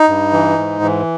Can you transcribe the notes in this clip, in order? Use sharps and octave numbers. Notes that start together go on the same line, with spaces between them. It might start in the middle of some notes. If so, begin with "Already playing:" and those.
Already playing: D#4
G2
E3
G#2
E3